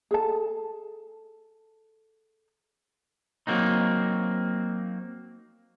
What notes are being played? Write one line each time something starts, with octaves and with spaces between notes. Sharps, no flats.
G#4 A4 A5
F#3 A#3 C4 D#4